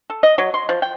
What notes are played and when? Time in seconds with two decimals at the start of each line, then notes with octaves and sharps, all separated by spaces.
0.10 A4
0.23 D#5
0.38 F#3
0.54 C6
0.69 F3
0.82 G5